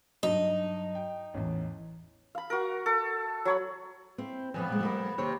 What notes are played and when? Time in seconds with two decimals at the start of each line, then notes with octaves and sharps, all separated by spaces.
0.23 G2 F#3 D#4
0.95 G5
1.34 A1 E2
2.35 F5 B5
2.50 F#4 A#4
2.86 A4
3.45 F#3 C#5 B5
4.18 C4 E4 C5
4.54 F2 F3 B3 C#5 G#5
4.69 A#2 G#3
4.81 G3 A3 A#4
5.18 D#2 C3 C5 C#5